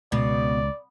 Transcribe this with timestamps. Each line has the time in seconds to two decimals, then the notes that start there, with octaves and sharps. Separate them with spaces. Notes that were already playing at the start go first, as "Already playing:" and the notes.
0.12 C#2 B2 D5